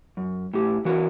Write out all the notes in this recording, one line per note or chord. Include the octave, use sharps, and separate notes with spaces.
F#2
A2 G4
E3 F#4 A#4 B4